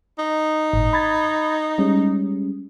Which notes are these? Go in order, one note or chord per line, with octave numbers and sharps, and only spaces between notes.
D#4
G#1 A2
B5 G#6 A6
G3 G#3 C#4